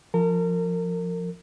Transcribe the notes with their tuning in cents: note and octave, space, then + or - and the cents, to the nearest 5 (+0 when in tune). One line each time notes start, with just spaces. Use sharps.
F3 +0 A#4 -30